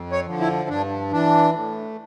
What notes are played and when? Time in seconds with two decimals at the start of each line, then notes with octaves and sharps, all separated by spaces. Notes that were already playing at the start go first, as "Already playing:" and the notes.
Already playing: F2
0.12 C#5
0.26 D3 F3
0.40 E4
0.69 G2 D4
1.12 E3 D4
1.54 A2